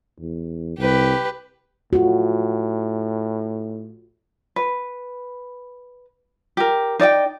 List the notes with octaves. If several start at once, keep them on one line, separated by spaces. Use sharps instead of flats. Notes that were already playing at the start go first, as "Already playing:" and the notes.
E2
C2 G4 B4
A2 F4 F#4
B4
G4 A#4
D#4 D5 D#5 G5